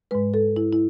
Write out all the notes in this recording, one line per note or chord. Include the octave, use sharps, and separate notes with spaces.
G#2 G#3 B4
A4
E4
E4